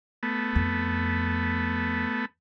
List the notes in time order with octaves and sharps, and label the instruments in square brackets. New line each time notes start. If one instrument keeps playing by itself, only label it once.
[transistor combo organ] A3 B3
[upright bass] F2